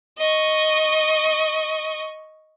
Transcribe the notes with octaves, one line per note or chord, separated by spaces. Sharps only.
D#5 C#6